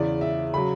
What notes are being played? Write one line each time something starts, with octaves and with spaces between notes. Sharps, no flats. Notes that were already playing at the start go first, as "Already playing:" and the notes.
Already playing: E2 C#3 E3 D5
E5
C#3 F#3 B5